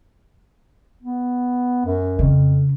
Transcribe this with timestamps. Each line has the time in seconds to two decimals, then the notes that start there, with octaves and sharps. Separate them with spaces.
1.03 B3
1.85 F#2
2.19 F2 C#3